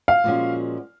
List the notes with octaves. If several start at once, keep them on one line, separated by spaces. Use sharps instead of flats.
F5
A#2 F3 G#3 C#4 F#4